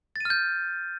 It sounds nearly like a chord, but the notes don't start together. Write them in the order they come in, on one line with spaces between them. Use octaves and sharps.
A6 D#7 F6 G6